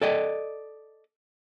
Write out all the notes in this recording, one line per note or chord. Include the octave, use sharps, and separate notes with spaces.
A4 D5 D#5